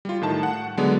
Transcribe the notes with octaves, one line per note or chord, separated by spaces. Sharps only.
G3 F4
A2 D#3 A5
F#5
D3 F#3 G#3 B3 D4